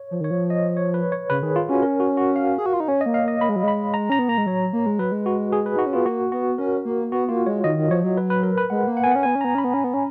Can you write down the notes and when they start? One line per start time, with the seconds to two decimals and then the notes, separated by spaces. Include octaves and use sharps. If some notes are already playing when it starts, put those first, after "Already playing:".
Already playing: C#5
0.11 F3
0.21 D#3 C#5
0.31 F3
0.50 D#5
0.77 C#5
0.94 B4
1.12 C#5
1.30 C#3 B4
1.42 D#3 G#4
1.56 F4
1.69 C#4 F#4
1.82 A#4
2.00 F#4
2.17 F#4
2.36 F5
2.58 G#4
2.66 F#4
2.73 F4
2.80 D#4
2.88 C#4 C#5
3.01 D#5
3.06 A#3
3.14 F5
3.23 A#3 D#5
3.41 A#3 B5
3.49 G#3
3.56 F#3
3.63 G#3 B5
3.94 A#5
4.10 C#4 A#5
4.19 B3
4.29 A#3 A#5
4.38 G#3
4.46 F#3 C#5
4.73 A#3
4.86 G#3
4.99 F#3 B4
5.12 G#3
5.26 F#4
5.52 G#4
5.66 B4
5.76 D#4 F#4
5.86 C#4
5.93 B3 F4
6.06 A#3 F#4
6.32 B3 F#4
6.58 C#4 A#4
6.85 A#3
7.12 B3 F#4
7.29 A#3 F4
7.46 G#3 C#5
7.64 D#3 D#5
7.78 D#3
7.90 F3 C#5
8.04 F#3
8.17 B4
8.30 B4
8.43 A#4
8.58 B4
8.70 G#3 F#5
8.87 A#3
8.97 F#5
9.04 B3 G#5
9.12 C#4 F#5
9.23 B3 G#5
9.35 C#4
9.41 B3 A#5
9.55 C#4 B5
9.64 B3
9.74 C#4
9.84 B3
9.94 C#4